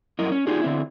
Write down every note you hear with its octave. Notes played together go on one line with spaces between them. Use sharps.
F#2 E4 A#4 D#5
C#4
D4 D#4 F4 G4 G#4
D3 C4 E4